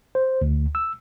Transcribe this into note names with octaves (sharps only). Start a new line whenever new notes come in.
C5
D2
E6